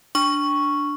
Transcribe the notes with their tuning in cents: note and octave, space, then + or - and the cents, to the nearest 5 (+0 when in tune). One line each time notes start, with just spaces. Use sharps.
D4 +0 C#6 +0